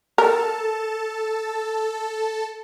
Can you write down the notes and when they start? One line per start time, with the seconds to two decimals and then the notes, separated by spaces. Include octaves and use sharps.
0.18 A4 A#4 A5